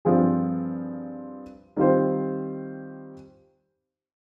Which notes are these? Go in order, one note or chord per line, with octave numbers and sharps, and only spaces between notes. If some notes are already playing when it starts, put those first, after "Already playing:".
G2 F3 C4 F4 G#4
D#3 G3 C4 F4 C5